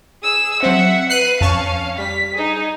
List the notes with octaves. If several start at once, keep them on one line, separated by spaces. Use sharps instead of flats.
G#4 E6
F#3 C4 E5 F#5
B4 F#6 C7 D#7
F2 C#4 F5 A5 C#6
G3 B6
D#4 G#4